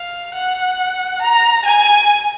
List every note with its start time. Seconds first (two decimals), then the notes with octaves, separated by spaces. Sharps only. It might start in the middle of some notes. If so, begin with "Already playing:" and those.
Already playing: F5
0.34 F#5
1.22 A#5
1.65 G#5